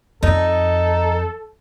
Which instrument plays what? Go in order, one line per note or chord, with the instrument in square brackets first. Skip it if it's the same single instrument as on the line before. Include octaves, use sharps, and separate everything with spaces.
[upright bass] F2 [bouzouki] D#4 [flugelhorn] A4